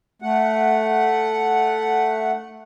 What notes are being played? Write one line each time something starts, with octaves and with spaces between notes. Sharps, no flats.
A3 F#5